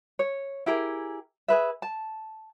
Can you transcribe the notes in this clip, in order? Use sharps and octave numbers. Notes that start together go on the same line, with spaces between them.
C#5
E4 G4 G#4 A#4
G#4 B4 E5
A5